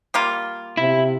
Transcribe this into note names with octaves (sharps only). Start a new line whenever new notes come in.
G3 A#3 F4
C3 E4